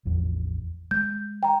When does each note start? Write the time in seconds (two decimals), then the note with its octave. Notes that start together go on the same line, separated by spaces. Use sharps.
0.05 A1 E2 F3
0.91 G#3 G6
1.43 G5 A#5